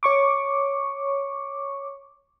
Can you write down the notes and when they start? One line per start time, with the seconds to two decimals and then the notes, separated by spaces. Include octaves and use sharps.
0.03 C#5 C#6 D6